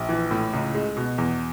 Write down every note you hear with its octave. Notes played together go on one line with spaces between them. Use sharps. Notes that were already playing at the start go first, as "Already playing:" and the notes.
Already playing: A#1
E3
A2
C#2
G#3
B2
E2